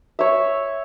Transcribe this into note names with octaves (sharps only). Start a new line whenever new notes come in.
C#5 E5